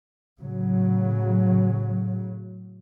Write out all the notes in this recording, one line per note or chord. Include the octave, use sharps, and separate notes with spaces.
A2 C#3 F#3